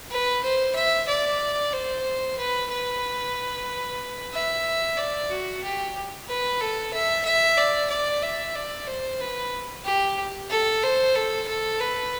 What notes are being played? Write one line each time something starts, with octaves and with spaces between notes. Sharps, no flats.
B4
C5
E5
D5
C5
B4
B4
E5
D5
F#4
G4
B4
A4
E5
E5
D5
D5
E5
D5
C5
B4
G4
A4
C5
A4
A4
B4